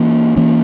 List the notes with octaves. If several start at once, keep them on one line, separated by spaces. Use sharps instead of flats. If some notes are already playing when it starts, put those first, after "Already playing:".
Already playing: E3 A#3 C#4
E3 A#3 C#4